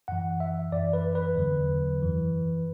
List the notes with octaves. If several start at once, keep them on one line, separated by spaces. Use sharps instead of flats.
F#2 E3 F#5
E5
F#2 E3 D5
B4
B4
E2 D3 F#3
F#2 E3